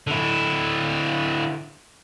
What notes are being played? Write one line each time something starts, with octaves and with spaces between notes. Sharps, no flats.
D3 E4